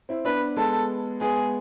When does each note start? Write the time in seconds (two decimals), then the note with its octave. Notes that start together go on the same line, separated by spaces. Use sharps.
0.09 C4 E4
0.25 B3 D4 B4
0.57 G#3 B3 A4
1.21 G#3 B3 G#4